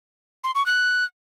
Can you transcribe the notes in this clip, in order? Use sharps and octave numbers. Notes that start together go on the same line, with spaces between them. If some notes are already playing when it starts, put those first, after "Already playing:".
C6
C#6
F#6